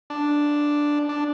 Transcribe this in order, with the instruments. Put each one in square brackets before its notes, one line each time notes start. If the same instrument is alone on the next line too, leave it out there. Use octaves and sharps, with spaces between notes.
[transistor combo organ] D4
D4